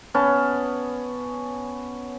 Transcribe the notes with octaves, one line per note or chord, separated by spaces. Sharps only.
B3 C#4 A5